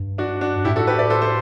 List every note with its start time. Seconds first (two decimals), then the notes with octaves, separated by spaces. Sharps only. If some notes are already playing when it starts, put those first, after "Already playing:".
Already playing: G2
0.18 D4 F#4
0.41 D4 F#4
0.64 A2 E4 G4
0.76 F#4 A4
0.87 G4 B4
0.99 B4 D5
1.10 A4 C5
1.22 A4 C5